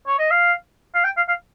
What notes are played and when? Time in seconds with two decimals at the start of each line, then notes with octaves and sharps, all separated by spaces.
0.07 C#5
0.19 D#5
0.31 F5
0.95 F5
1.04 G5
1.17 F5
1.28 F5